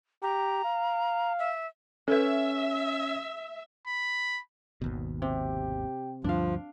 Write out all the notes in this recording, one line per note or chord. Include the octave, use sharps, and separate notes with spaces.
G4 A#5
F5
E5
C#4 A4 B4 E5
B5
G#1 D#2 B2
C3 G4
D2 G2 F3 D4 F5